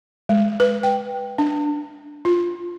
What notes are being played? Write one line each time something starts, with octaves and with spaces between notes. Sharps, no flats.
G#3
B4
G5
D4
F4